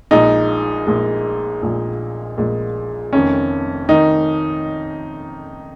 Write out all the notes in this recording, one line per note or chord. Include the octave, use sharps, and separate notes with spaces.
A#1 A#2 G#3 D#4
A#1 A#2 G#3
A#1 A#2 G#3
A#1 A#2 G#3
F1 F2 D#3 C#4
D#3 D#4